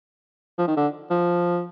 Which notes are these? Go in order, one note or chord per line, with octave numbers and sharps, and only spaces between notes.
F3
D#3
D3
F3